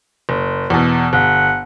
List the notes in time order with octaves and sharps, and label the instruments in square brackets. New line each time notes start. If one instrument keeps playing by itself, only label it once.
[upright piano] F#1
E2 B2
[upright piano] G1 [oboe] F#5